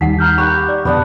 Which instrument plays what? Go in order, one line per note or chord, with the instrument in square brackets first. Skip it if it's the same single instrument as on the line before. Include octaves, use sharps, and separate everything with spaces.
[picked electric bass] D#2 G3 [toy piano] D#4 F#5 [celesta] B6
[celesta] A#5 F6 G6
[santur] G4 A#4 F#5 [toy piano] B5 [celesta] C#6 F#6 G6
[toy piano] D5
[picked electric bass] F2 B2 D3 [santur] B3 D4 F#5